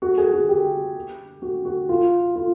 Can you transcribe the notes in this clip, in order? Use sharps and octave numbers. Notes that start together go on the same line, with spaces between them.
F#4
G#4
F#4
G4
F#4
F#4
F4
F4